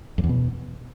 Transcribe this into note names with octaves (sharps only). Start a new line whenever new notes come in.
F2
E2
B2